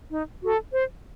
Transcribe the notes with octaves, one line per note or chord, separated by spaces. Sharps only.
D#4
F#4 A4
C5